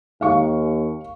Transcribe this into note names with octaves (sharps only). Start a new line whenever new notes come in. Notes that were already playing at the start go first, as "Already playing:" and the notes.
D#2 F5 C#6